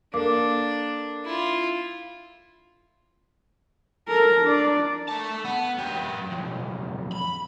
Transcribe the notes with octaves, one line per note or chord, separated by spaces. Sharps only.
A#3 D4 A4 D6
E4 F4
A4 A#4
D4 D5
A3 A5
B3
F#2 G4
B1 F2
B5